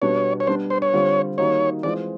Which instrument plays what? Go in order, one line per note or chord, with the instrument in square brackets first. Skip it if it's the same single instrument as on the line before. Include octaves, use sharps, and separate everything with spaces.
[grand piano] B2 G3 B3 D4 F#4 [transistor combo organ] C#5
[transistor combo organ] C#5
[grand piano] G3 B3 D4 [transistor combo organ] C5
[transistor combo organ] C5
C#5
[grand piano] D3 G3 C4 F4
[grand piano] D#3 G3 A#3 D#4 F#4 [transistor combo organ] C#5
[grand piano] E3 G#3 C4 F4 [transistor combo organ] D5